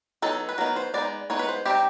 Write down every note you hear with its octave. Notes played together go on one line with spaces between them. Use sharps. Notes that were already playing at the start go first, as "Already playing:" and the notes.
F#3 B3 D#4 A4
B4
F#3 B3 D#4 A#4
C5
G#3 B3 D#4 D5
G#3 B3 D#4 C#5
B4
C5
G3 C4 D#4 G4